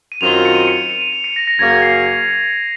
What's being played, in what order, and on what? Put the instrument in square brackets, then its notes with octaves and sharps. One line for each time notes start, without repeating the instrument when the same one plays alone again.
[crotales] D#7
[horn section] F#2 D#3 F#3 C4 F4 [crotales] F7
[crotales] C#7
D#7
C#7
D#7
D#7
D#7
C#7
A#6
A#6
[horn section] F#2 C#3 F#3 A#3 C#4 [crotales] G#6
[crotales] A#6
C7
C7
C#7